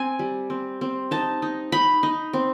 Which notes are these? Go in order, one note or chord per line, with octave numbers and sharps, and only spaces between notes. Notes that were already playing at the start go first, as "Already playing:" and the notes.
Already playing: C4 G#5
G3
C4
C4
D#4 A5
D#4
D#4 B5
D#4
C4